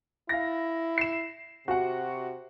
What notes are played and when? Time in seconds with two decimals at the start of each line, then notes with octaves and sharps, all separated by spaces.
0.29 E4 F5 A#6
0.98 C7 E7
1.68 C3 F#4 F#5